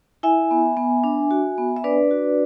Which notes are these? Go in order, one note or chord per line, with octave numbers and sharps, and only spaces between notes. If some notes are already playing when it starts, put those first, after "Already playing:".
E4 E5 G#5
B3
B3
D4
F#4
B3
E5
D4 B4 D5
F#4